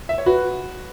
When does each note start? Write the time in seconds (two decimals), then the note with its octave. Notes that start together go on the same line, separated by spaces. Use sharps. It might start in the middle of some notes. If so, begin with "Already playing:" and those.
0.09 E5
0.18 C#5
0.26 F#4 B4